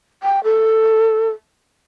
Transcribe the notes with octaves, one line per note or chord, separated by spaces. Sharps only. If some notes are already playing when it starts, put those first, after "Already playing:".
G5
A4